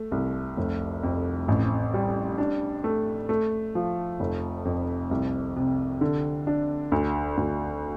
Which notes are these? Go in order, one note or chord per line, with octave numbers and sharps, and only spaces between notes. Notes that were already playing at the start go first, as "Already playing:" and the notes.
Already playing: A3
C2
F1
F2
A1
G3
D4
A3
A3
F3
F1
F2
C2
C3
D3
D4
D2
D2